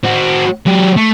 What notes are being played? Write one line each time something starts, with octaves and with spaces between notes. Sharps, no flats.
C4 F#4
F#3 G4
A3